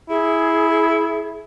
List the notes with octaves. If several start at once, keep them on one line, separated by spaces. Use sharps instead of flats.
E4 G#4